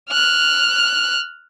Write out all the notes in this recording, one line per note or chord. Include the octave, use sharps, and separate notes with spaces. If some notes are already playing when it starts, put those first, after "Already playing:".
F6 F#6